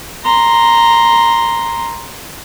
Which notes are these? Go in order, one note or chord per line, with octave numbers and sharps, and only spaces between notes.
A#5 C6